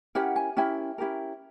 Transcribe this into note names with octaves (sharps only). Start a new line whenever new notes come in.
C#4 E4 G4 A#4 F#5
G#5
C#4 E4 G4 A#4 G5
C#4 E4 G4 A#4